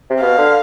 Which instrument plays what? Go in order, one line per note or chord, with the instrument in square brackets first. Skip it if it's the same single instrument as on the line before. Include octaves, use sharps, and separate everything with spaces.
[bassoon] C3
[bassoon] B2 [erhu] F5
[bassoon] D3